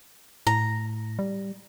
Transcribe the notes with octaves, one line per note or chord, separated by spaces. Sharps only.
A2 A#5
G3